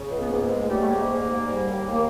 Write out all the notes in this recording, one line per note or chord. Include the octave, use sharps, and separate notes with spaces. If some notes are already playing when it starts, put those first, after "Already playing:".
Already playing: C#3
C#2
B3
G#2 A#3
G#2 G#3
G3 A3
A3
G#2 A#3
G#2
G#2
G3
D#2
D#2
A#3